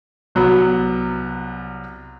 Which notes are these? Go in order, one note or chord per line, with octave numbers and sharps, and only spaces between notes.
C2 F#3 B3